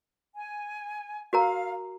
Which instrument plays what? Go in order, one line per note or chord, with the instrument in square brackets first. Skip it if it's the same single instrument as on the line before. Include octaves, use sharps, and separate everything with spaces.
[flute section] G#5
[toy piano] F#4 A#4 A#5 [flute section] F5